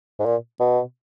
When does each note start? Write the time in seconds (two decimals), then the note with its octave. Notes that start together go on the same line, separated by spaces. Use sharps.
0.19 G#2
0.26 A#2
0.60 B2